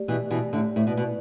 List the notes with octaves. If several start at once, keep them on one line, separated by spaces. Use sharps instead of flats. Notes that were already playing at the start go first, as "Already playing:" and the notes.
Already playing: A3 G4 D5
B2 E3
B2 E3
A2 D3
A2 E4 B4 D5
B2
B2